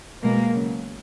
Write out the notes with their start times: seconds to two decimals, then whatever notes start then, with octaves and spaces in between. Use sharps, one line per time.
0.23 B2 G#3 A#3
0.54 C#3 F#3